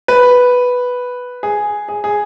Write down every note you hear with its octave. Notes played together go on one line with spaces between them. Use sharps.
B4
G#4
G#4
G#4